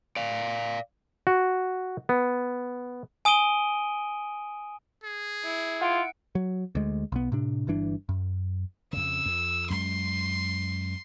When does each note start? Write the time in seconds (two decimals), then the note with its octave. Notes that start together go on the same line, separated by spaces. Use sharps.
0.16 D5 F5
1.27 F#4
2.09 B3
3.25 G#5 D#6 D7 D#7 G7
5.04 G#4
5.44 E4
5.81 F4 F#5 D7
6.35 F#3
6.75 D2 G#3
7.12 B1 B3
7.32 A2 C3 D4
7.67 G1 G2 E3 D4
8.09 F#2
8.93 F2 C#3 E6
9.26 F2
9.70 F#2 G#3 C6